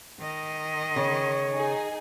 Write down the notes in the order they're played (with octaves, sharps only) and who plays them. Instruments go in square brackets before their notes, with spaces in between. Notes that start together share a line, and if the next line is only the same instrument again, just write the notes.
[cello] D#3 D#5
[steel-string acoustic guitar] C#3 [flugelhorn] C#5
[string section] D#4 G#4